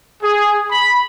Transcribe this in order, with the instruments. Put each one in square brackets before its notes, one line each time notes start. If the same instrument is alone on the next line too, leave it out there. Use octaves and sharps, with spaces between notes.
[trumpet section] G#4
B5